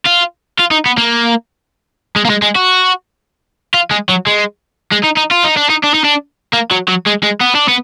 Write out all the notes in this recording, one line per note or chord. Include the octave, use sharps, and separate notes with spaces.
F4
F4
D#4
B3
A#3
G#3
A#3
G#3
G#3
F#4
F4
G#3
F#3
G#3
G#3
D#4
D#4
F4
D#4
D4
D#4
D4
D#4
D4
A#3
F#3
F#3
G#3
G#3
B3
D4
B3